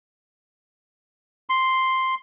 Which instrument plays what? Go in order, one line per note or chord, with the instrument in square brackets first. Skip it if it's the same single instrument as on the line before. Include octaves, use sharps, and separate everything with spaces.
[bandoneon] C6